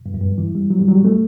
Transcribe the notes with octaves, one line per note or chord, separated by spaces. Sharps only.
G2
F#2
G2
E3
G3
F#3
G3
F#3
G3
A3